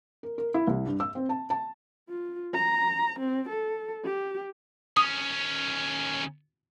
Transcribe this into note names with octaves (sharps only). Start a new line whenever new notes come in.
A#4
A#4
E4
C2
G2
E6
C4
A5
A5
F4
A#5
C4
A4
G4
D#2 C#4 D#6